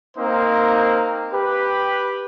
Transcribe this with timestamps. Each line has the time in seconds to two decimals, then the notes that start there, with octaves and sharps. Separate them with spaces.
0.17 A#3 C4 D#4 C5
1.32 G4 B4